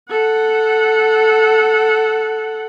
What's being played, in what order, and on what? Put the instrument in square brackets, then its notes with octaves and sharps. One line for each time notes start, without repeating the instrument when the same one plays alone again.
[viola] A4 F#5